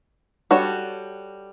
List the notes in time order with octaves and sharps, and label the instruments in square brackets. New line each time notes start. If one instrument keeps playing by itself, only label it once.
[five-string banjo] G3 D4 F#4 A4 C#5